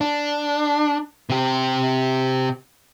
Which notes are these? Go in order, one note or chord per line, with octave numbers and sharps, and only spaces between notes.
D4
C3 G4